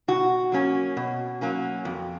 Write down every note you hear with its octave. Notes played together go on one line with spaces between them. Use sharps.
B2 F#4
F#3 A#3 C#4
B2
F#3 A#3 C#4
F2